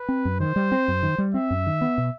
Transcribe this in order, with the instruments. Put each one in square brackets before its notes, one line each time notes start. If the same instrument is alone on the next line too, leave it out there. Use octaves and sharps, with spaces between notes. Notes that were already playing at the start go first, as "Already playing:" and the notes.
Already playing: [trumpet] B4
[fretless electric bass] C4
F#2
[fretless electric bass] D#3 [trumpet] C5
[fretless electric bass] G3
C4
F#2
D#3
G3
[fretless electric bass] C4 [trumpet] E5
[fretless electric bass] F#2
D#3
B3
B2